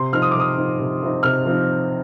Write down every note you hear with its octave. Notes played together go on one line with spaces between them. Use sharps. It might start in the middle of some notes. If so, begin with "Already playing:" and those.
Already playing: C3 C6
F3 C4 D#4 F6
D#6
D6
C3 D#6
F3 C4 D#4
C3
F3 C4 D#4
C3 F6
F3 C4 D#4